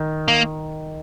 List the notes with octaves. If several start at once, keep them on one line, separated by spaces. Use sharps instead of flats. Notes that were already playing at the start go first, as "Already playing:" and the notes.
Already playing: D#3
A#3